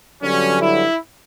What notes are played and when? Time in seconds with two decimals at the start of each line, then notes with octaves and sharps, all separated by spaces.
0.22 G2 D3 F#3 C#4
0.61 E4